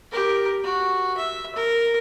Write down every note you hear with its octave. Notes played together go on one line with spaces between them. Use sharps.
G4 A#4
F#4
E5
A#4